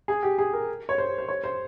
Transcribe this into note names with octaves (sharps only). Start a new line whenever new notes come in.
G#4
G4
G#4
A#4
C#5
C5
C5
C#5
C5